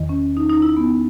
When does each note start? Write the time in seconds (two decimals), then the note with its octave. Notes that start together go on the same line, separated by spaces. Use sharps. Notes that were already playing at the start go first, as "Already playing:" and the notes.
Already playing: E2 D#3
0.09 C#4
0.37 D#4
0.50 D#4
0.62 E4
0.77 B3